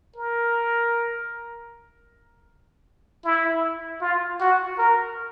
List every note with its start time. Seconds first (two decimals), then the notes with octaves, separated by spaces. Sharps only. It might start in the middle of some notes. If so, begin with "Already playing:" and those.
0.16 A#4
3.25 E4
4.02 F4
4.40 F#4
4.78 A#4